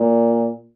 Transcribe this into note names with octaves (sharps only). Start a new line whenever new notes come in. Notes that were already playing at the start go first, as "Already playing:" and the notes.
Already playing: A#2